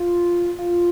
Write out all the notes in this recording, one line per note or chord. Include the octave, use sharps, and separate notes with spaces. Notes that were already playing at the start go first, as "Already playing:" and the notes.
Already playing: F4
F4